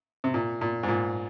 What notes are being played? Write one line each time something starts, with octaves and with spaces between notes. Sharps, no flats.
C3
A#2
A#2
G#2
A#2